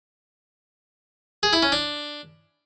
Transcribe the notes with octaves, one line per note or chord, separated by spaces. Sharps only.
G#4
E4
C#4
D4